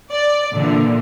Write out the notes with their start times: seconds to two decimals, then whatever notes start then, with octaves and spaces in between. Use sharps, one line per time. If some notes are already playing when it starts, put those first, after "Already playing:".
0.12 D5
0.55 A#2 D3 E3